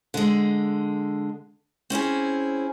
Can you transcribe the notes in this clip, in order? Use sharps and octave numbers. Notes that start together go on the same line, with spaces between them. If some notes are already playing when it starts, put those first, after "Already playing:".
D3 G#3
C4 C#4 E4 G#4